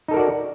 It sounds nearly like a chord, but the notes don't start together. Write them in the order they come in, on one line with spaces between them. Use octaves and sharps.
D#4 A4 A#4 F#4 D5